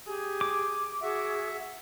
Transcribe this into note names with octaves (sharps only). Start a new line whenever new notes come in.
G4 G#4
D6
F#4 G#4 E5